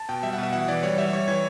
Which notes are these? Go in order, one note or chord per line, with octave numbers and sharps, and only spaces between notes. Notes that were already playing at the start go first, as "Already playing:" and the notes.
Already playing: A5
B2 G5
G3 E5
F#5
B2
E5
E3 F#5
E3 D5
G3 C#5
G3 E5
G3 C#5
E3 C#5